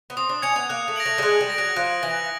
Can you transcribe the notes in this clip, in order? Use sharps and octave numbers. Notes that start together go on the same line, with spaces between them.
B3
C4 D#6
D4
C#4 G#6 C#7 F7
B3
A#3 F#6
A3
A#6 D7 F#7
A3
G3
G#3 F#6
G3
A#6 D7 F#7
F#3
F3 F#6
E3 A#6 D7 F#7